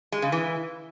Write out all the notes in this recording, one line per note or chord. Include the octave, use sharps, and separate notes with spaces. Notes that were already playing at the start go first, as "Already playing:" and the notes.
G#3
C#3
E3